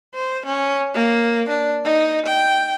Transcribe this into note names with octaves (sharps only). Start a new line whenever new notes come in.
C5
C#4
A#3
D4
D#4
G5